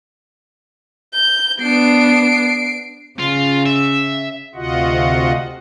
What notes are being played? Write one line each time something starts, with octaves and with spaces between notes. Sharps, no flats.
G6
B3 D4 C7 D7
C#3 F4
E5
D2 C3 F4 F#4 D#5 F#5